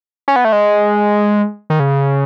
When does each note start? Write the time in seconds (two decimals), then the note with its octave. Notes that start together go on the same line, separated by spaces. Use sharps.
0.28 C#4
0.36 B3
0.45 A3
0.53 G#3
1.70 D#3
1.80 C#3